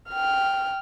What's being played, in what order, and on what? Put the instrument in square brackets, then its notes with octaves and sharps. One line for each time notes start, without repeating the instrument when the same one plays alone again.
[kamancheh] G5 F6